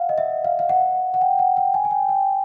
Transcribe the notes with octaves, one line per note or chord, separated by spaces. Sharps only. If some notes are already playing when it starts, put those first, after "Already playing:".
Already playing: F5 F#5
D#5
E5
F5
F5
F#5
F#5
G5
F#5
G5
G#5
G#5
G5
G5